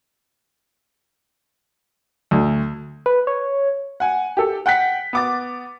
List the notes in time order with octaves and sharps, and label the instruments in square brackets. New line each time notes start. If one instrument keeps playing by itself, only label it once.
[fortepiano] D2
[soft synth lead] B4
C#5
[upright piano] F#5 G#5
G4 A4
F#5 G5 F#6 B6
B3 D6 A6